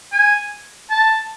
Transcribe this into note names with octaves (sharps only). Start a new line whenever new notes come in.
G#5
A5